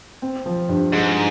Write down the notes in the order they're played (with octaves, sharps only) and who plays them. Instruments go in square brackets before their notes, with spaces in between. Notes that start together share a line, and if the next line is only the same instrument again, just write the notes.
[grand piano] C4
F3
G2
[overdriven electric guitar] G#2 [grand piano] G#3